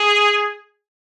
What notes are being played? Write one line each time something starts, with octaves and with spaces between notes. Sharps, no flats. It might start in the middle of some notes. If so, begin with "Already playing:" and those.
Already playing: G#4